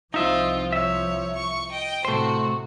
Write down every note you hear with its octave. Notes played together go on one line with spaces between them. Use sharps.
C2 F3 C4 D#4 F4 E5
C#5 E5
C#6
D#5 G5
A2 C3 A3 F#4 C5